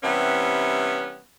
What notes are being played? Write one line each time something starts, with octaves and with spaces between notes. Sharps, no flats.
C3 E3 G3 B3 C#4